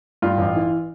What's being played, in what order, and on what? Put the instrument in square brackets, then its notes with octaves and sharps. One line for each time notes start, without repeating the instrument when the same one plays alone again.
[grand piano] G2 F4
A1
E3